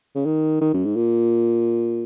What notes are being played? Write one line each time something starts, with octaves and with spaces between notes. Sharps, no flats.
C#3
D#3
D#3
F#2
G#2
A#2